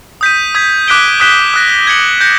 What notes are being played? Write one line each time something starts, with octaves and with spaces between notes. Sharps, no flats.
D#6 G6 B6 D#7
D#6 G#6 B6
D6 F#6 B6 D7 G7
D#6 F#6 B6 E7 G7
D#6 F#6 A#6
G#6 C#7 F#7
G6 A#6 C#7